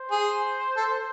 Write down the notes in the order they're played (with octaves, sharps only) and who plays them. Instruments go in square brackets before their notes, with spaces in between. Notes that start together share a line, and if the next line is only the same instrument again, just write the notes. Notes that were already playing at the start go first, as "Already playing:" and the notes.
Already playing: [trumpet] C5
[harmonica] G#4
A4